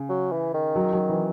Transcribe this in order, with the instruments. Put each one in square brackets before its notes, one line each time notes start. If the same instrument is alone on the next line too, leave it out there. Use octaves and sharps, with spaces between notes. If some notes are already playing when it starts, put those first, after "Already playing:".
Already playing: [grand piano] C#3
[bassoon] F#3
E3
D#3
[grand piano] F#3
F#3
E3